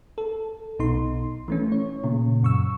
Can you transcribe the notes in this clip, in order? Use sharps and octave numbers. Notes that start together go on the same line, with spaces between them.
A4
B1 B2 D#4 C6
E3 A3 C#4
C#5
A#2 C#3
F#2 C#6 E6